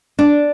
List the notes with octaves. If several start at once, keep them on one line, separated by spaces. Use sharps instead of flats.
D4